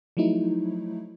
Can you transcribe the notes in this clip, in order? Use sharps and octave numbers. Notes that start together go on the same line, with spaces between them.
F3 F#3 A3 D#4 E4